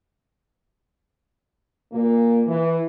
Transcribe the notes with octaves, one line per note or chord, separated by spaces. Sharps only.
A#2 A#3
E3